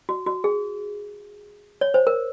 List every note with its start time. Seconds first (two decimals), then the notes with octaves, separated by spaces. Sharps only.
0.09 F#4
0.26 F#4
0.44 G#4
1.81 C#5
1.94 C5
2.07 A#4